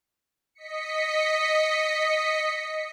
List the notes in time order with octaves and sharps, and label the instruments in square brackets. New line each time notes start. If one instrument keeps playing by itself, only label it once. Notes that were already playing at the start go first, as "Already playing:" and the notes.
[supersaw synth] D#5 B6 C#7